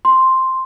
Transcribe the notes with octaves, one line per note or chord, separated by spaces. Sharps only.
C6